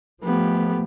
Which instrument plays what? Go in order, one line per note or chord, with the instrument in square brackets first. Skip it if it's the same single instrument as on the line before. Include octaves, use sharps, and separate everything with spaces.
[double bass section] F3 A3 [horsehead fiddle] B3 G4